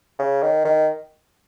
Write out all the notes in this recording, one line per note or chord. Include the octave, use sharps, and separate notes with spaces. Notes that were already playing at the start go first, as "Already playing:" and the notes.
C#3
D#3
D#3